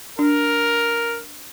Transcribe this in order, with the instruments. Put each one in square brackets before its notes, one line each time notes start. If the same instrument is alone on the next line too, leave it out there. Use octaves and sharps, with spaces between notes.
[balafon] D4 [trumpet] A#4